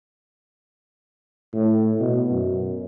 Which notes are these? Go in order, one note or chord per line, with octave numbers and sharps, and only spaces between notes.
A2
B2
F#2